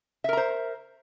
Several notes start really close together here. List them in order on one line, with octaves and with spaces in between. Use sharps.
E5 A#4 A#5 C5